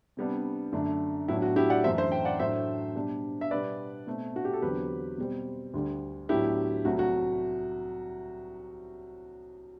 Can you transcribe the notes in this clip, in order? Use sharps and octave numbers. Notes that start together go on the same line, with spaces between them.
C3 G3 B3 D4
F#2 D3 A3 D4
A2 F#3 B3 D4 E4
F#4
E4 G4
D5 F#5
F#2 E3 A3 C5 E5
C5 E5
E5 G5
D5 F#5
A2 F#3 A3 D4 C5 E5
B2 G3 D4
E5
B2 G3 B3 D4 B4 D5
B2 A3 C4
F#4
G4
A4
E2 D3 F#3 C4 G4 B4
B2 G3 C4
D2 D3 G3
A2 F#3 B3 D4 E4 G4
C2 C3 F#3 A3 F#4
F#4